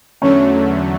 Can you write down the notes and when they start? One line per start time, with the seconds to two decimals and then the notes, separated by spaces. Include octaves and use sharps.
0.21 E2 D3 F#3 A3 C#4